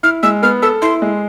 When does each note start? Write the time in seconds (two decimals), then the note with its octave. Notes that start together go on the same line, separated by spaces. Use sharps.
0.03 E4 F6
0.23 G#3 E6
0.42 B3 F6
0.62 A4 E6
0.82 E4 C6
1.02 G#3